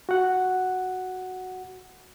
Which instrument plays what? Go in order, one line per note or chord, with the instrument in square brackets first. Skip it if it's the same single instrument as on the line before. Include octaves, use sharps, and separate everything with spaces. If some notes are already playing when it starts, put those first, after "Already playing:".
[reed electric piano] F#4 F#5